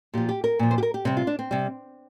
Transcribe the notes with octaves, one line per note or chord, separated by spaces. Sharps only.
A#2 F3 G4
G4
A#4
A#2 F3
C5
G4
A#4
G4
C3 G3 C4
F4
D4
C4
C3 G3